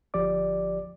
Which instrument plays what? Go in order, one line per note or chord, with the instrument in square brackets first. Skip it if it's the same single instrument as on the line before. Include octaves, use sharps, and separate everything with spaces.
[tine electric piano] G1 F3 G4 D5 D6